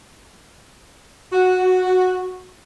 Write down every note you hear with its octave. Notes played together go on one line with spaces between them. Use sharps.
F#4